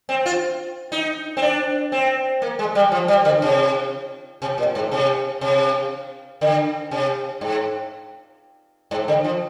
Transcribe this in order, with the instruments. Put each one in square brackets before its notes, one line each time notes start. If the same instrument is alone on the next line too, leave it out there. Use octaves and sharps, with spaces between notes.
[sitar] C4
F4
D#4
C4
D4
C4
A#3
G#3
G3
F3
G3
D3
C3
C3
A#2
G#2
C3
C3
D3
C3
G#2
G#2
D3
F3